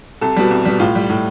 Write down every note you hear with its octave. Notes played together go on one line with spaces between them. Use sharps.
C2 A4
B2 G3
C2
B2 G3
A2 F4
G3
A2